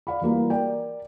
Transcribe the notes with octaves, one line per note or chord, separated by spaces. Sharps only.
D5 F5 B5
E3 G3 A#3 F#4
A#4 D5 G5